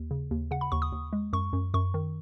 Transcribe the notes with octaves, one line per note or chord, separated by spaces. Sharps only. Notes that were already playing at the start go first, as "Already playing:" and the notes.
Already playing: D#2
C#3
D#2
C#3 F#5
B5
D#2 C#6
D#6
D#2
G#3
F#2 C#6
F#2
F#2 C#6
D#3